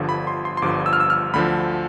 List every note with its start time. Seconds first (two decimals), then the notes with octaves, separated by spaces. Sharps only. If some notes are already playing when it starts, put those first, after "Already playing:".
Already playing: G1 G2 D3 F3
0.09 B5
0.27 C6
0.45 C6
0.57 C6
0.62 G1 G2 D3 F3 D6
0.86 E6
0.93 F6
1.00 E6
1.10 F6
1.33 D2 D3 F3 B5